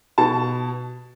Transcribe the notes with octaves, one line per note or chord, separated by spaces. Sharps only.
B2 A5